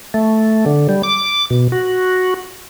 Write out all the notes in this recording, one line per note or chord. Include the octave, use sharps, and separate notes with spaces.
A3
D3
G3
D6
B2
F#4